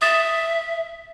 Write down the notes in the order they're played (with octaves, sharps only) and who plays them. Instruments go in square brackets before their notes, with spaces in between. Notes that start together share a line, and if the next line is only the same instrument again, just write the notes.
[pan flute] E5 [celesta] D#6 A6 E7